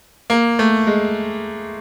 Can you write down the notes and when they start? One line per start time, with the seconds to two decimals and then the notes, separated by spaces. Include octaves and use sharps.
0.30 A#3
0.59 A3
0.87 G#3